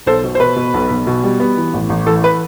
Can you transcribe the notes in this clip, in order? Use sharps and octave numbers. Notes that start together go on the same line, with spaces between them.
B1 A4 C5
B2
C5
B2 B4
B2
B1
B1
B2
G3
B3
E3
A1
A1
E3 A4
B4